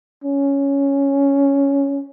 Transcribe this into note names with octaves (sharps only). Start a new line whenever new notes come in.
C#4